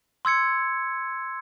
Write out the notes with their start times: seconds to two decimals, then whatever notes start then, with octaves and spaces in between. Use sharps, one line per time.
0.25 C6 E6 G#6 C#7